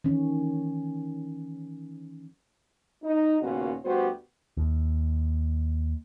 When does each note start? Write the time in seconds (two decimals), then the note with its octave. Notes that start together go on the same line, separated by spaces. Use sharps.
0.04 D#3 E3 C#4
3.03 D#4
3.41 D#2 A#2 C#3 B3 C#4 F#4
3.85 D2 G3 B3 F#4 G4 C5
4.57 D#2